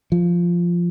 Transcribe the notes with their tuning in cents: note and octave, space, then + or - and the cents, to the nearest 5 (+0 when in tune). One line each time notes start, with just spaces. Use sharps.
F3 -5